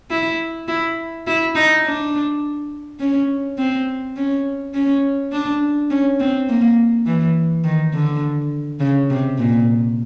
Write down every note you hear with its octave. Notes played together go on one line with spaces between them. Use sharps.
E4
E4
E4
D#4
D4
C#4
C4
C#4
C#4
D4
C#4
C4
A#3
E3
D#3
D3
C#3
C3
A#2